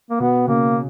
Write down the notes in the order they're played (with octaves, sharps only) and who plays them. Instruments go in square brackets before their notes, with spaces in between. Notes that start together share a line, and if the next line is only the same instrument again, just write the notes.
[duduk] A#3
[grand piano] B2 [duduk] B3
[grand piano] C#3 [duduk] A#3